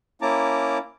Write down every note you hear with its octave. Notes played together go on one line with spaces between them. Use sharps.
A#3 C#4 E4 A5 A#5 D6